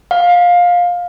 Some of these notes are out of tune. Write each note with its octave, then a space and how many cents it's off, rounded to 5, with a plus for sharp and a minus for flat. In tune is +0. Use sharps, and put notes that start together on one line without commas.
F5 +20